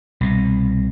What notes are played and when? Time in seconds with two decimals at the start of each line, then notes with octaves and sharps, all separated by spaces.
0.21 C2 B2